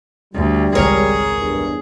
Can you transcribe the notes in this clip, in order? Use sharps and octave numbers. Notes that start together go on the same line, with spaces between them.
D2 G3
G#1 C#2 G#4 A#4 C#5
E2 G2